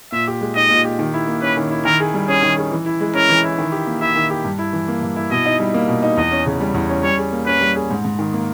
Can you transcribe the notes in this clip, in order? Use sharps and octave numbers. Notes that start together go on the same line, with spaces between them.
A#2 E5
G4
G#3
D#4 D#5
A#2
G4
D#3
E4
A#3
C#4 B4
D#3
E4
D#3 A#4
G#4
G3
C#4 G#4
D#3
G#4
E3
E4
G#3
C#4 A#4
E3
E4
D#3
G4
A#3
E4 E5
D#3
G4
G2
E4
E3
A#3
G2
E4
B2 D#5
D#4
G3
A#3
B2
D#4
E2 D#5
C#4
C#3
G3
E2
C#4
G3 C#5
G#4
A#3
C#4 B4
G3
G#4
G#2
G#2
D#3
A#3